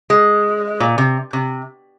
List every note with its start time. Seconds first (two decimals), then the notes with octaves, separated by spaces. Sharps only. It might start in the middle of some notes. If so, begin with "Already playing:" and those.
0.10 G#3
0.80 A#2
0.98 C3
1.33 C3